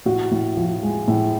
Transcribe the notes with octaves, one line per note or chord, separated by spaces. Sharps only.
A2 F#4
A2
F3
G#3
A2